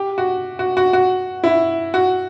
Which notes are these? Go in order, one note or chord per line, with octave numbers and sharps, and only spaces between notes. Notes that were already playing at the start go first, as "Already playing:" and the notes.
Already playing: G4
F#4
F#4
F#4
F#4
E4
F#4